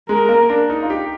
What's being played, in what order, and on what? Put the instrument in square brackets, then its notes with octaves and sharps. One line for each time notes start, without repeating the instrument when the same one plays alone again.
[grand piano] G#3 [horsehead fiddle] A#4
[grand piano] A#3
D4
D#4
F4
G4